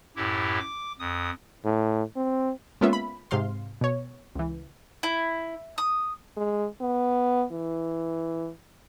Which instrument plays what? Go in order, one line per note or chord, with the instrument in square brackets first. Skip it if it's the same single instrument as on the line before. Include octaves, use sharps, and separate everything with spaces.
[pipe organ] F#2 A2 E4 G4
D6
F2 D#6
[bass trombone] A2
C4
[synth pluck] G#3 A#3 B3 C#4 F4 E5
B5
G#2 C3 F5 C6
B2 C#5
C#2 E3
[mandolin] E4
D#6
[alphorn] G#3
B3
E3